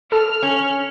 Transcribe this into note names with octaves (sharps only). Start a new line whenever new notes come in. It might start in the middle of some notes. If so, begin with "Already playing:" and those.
A4 F6
C#4